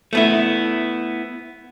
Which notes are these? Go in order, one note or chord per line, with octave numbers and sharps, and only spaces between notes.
A3 B3 E4